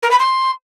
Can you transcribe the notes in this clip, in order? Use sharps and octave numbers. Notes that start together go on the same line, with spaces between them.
A#4
B5
C6